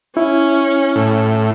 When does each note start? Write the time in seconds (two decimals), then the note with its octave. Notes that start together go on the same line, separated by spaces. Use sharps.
0.17 C#4 E4
0.96 A2